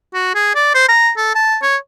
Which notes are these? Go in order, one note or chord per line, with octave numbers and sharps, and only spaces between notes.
F#4
G#4
D5
C5
A#5
A4
A5
C#5